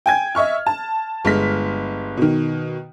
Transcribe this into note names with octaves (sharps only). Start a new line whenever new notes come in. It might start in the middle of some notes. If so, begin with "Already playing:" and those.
G5 G#5 G#6
D#5 E5 C#6 F6
A5
G1 G#3 F6 B6
B2 D#3